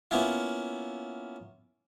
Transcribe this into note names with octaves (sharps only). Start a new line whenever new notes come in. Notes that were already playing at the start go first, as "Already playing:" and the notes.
A#3 B3 C#4 E4 F4